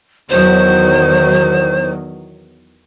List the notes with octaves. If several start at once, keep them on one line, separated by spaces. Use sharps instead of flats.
E2 D#3 F#3 C5